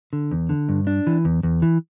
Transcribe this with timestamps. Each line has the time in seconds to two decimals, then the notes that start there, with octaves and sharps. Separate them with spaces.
0.13 D3
0.31 E2
0.49 D3
0.69 G2
0.87 D4
1.07 E3
1.25 E2
1.43 E2
1.62 E3